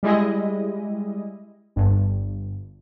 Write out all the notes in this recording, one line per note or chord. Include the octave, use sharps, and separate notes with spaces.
G3 G#3 E4 D#5
G1 G2